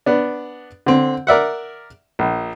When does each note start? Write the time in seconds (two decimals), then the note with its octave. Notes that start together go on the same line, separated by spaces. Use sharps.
0.06 B3 D4
0.86 D3 C4
1.27 A#4 D5 E5 F#5
2.19 A#1